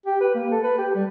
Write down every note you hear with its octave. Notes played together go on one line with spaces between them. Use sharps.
G4
B4
A#3
A4
B4
G4
G3